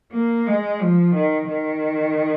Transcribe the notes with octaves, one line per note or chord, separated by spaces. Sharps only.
A#3
G#3
F3
D#3
D#3